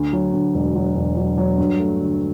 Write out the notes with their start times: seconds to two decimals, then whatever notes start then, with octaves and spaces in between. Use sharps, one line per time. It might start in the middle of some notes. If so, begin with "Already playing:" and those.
Already playing: D2
0.13 F#3
0.33 D2
0.54 E1
0.75 F#3
0.96 E1
1.17 F#3
1.38 F#3
1.58 G2
1.79 A3
2.00 D3